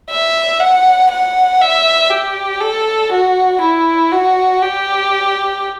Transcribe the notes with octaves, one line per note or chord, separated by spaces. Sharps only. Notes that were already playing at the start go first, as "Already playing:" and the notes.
E5
F#5
F#5
E5
G4
A4
F#4
E4
F#4
G4